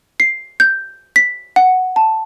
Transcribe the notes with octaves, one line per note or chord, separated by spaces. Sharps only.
C7
G6
B6
F#5
A5